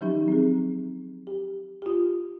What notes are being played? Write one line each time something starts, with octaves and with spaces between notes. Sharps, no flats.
D#3 F3 F#3 C#4 D#4 G4
C4 G#4
G4
F4 G4